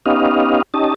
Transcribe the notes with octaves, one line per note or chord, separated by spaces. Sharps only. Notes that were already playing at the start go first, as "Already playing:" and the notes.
B3 C#4 D#4 G4 D#5 F5
C#4 D#4 G4 D#5 A5